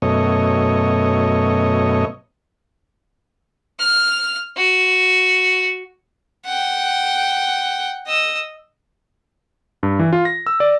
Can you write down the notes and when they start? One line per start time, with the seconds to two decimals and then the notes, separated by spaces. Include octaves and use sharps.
0.02 F#2 B2 A3 C#5 D#5
3.80 F6
4.57 F#4
6.46 F#5 G5
8.07 D#5 E6
9.83 G2
9.99 E3
10.13 F4
10.25 A#6
10.47 E6
10.60 D5